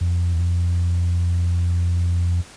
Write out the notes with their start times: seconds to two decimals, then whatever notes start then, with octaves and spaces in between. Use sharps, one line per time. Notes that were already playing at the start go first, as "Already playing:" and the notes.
0.01 F2
0.34 E2
0.39 F2